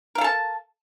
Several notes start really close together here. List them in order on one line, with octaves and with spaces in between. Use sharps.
A#4 F5 A4 A5